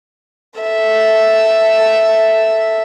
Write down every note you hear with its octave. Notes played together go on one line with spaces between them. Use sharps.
A4 E5